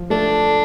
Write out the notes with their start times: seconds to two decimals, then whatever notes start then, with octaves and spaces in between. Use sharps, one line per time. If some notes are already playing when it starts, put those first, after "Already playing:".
Already playing: F3
0.10 A3 D4